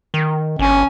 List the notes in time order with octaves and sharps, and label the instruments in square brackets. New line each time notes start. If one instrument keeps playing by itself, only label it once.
[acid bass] D#3
[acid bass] G1 [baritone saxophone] C#4